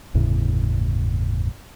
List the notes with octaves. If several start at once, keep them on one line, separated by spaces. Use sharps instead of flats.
G1 E2 A2 C#3